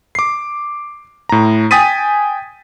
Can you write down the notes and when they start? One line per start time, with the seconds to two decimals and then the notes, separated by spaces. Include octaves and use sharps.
0.15 D6 C7
1.29 A2 A#5
1.71 G5 G#5 D#6 A6 B6 D#7